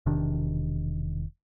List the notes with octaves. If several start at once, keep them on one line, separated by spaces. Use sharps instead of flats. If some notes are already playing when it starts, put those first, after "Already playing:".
E1 C3 D#3 D4